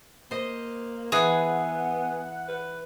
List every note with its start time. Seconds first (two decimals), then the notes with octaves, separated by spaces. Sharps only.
0.31 A#3 C5 D#5
1.12 E3 B3 G#4 F#5
2.48 B4